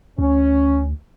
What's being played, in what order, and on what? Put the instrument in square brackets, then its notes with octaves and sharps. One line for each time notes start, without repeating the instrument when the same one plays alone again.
[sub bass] D2 [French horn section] C#4